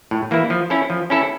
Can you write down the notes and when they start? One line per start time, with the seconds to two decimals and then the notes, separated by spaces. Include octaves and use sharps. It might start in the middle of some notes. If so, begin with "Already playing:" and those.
0.11 A2
0.31 E3 A#3 E4
0.50 F3
0.70 C#4 E4 A4
0.90 F3
1.10 C#4 E4 A4